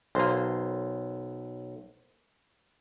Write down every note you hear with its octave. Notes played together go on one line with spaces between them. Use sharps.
B1 A#3 C5